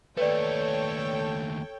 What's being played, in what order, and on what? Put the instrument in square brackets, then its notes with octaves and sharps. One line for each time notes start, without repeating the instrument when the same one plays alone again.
[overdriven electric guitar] D#2 A3 [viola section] A4 C#5 G5 [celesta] B4 D5